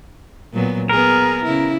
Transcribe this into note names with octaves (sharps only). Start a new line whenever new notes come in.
A#2 F#3 B3
B3 G#4 A#4
C#3 E4